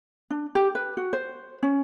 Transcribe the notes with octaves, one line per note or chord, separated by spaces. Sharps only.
D4
G4
B4
F#4
C5
C#4